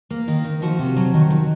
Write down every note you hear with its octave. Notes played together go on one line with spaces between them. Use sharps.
A#3
D#3
D#3
F3 F#4
C3
F#3
D#3
F#3